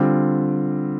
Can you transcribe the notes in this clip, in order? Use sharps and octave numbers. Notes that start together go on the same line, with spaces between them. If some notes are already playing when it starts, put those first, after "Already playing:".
Already playing: D3 G3 C4 F4